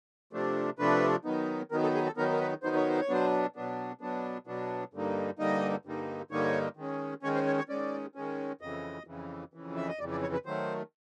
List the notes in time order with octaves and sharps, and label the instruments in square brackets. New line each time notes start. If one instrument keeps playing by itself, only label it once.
[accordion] C3 F3 A3 D4
C3 F3 A3 D4 B4
D#3 F#3 B3 D#4
D#3 F#3 B3 D#4 A#4
A4
G#4
A4
D#3 F#3 B3 D#4 A#4
A#4
B4
D#3 F#3 B3 D#4 C5
C#5
C5
C#5
B2 F#3 B3 D4 C5
B2 F#3 B3 D4
B2 F#3 B3 D4
B2 F#3 B3 D4
G2 D3 G3 A#3 D#4
G2 D3 G3 A#3 D#4 D#5
G2 D3 G3 A#3 D#4
G2 D3 G3 A#3 D#4 C#5
D#3 G#3 C#4
D#3 G#3 C#4 C#5
C5
C#5
C#5
D#3 G#3 C#4 D5
D#3 G#3 C#4
F2 C#3 E3 D#5
F2 C#3 E3
F2 C#3 E3
E5
D#5
F2 D5
C#3 E3
D5
C#5
B4
D#3 F#3 A3 C5